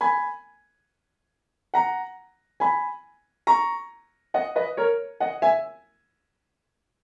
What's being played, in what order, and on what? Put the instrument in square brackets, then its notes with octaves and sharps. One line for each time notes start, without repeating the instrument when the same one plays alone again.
[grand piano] G#5 B5
F#5 A#5
G#5 B5
A#5 C#6
D#5 F#5
B4 D#5
A#4 C#5
D#5 F#5
E5 G#5